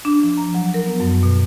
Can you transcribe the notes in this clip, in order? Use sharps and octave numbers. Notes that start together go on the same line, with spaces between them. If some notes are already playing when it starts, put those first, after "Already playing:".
D4
F3
A#5
F#3
A#4
B3
F#2
B2